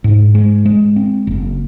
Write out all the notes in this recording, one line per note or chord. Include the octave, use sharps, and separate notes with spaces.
G#2
G#3
G#3
C4
F#1